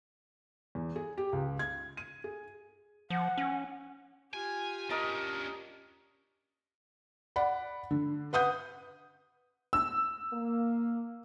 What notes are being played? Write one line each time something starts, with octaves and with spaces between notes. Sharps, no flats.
E2
G#4
G4
C#2
G#6
D#7
G#4
F3 F#5
C#4
F4 G4 G#5
C#4 D4 A#4 D#5 A5
D5 F#5 B5
D3
B4 F#5 D#6 G6
E6
A#3